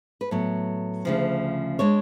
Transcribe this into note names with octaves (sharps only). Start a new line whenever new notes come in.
B4
A2 F#3 B3 C#5
D2 C#3 F3
G#3 D4 C#5